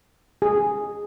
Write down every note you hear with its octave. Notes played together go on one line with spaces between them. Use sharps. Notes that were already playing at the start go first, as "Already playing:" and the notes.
G#4